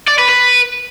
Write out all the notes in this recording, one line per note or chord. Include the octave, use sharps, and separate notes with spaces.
D5
B4
B4